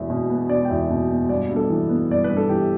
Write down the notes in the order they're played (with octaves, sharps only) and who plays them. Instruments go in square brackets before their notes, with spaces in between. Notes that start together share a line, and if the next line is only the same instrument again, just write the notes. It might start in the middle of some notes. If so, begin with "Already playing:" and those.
Already playing: [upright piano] E1 E2 E5
B2
B3
E1 D5
G5
E2 E5
B2
B3
G1 D5
G2
A4
E3
B3
G1 D5
B4
G2
A4
E3 G4